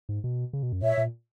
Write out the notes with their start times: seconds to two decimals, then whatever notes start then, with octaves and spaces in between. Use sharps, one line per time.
0.09 G#2
0.24 B2
0.53 C#3
0.63 B2
0.72 F#2
0.82 A#2 C#5 E5
0.98 A#2